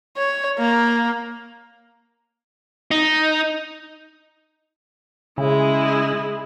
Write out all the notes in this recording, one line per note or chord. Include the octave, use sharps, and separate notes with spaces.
C#5
A#3
D#4
C#3 G#3 E4